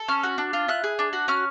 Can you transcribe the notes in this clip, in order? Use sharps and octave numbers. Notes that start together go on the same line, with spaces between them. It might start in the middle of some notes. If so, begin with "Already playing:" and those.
Already playing: A4
C#4 F6
F#4
D4
F4
E4 F#6
G#4
D4
F#4
C#4 F6